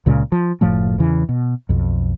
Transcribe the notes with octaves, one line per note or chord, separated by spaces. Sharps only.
C#2 A#2 C#3 G#3
F3
F#1 A2 F3 A3
E2 C#3 E3
B2
B1 F2